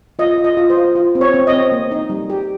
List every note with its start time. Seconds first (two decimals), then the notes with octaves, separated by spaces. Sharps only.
0.19 F4 D#5
0.38 F4
0.44 D#5
0.57 F4
0.70 C5
0.77 F4
0.95 F4
1.15 C4
1.21 C#5
1.34 C4
1.47 D#5
1.53 C4
1.72 A#3
1.91 D#4
2.10 G3
2.30 G4